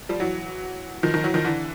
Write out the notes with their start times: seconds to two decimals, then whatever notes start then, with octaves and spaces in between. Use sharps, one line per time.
0.09 F3 G3
0.20 E3 F#3
1.03 D#3 F3
1.14 D#3 F3
1.24 E3 F#3
1.34 D#3 F3
1.45 D3 E3